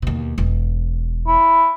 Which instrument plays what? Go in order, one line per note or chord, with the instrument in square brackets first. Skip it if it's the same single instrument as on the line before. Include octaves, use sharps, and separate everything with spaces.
[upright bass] D#2 B2
E1
[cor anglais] E4